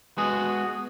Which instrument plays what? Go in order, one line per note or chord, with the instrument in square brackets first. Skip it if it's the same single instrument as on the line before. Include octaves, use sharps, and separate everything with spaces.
[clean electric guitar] G#3 B3 F#4 G#4